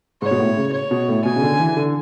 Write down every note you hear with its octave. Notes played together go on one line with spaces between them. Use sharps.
G#2 C#5
B2
A2
C#3
C#5
B2
A2
B2 G#5
C#3
D3
E3
D3